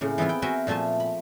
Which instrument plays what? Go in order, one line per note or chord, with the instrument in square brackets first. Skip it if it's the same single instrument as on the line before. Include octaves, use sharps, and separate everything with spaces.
[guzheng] A2 C#3 A#3
E3 B3 C4 E4 F4
G5
F#4 A#4 C5 E5 G#5
A#2 F3 A3 G#5 A5
B5